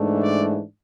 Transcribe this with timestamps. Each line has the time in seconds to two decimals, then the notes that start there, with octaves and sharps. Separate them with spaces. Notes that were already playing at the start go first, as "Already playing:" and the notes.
Already playing: G#2 E3 A3 D4
0.24 D5